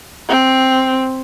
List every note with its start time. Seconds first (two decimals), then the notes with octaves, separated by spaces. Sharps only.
0.29 C4